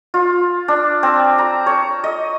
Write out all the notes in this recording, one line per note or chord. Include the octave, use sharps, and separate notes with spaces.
F4
D4
C4
A#5
C#5
D#5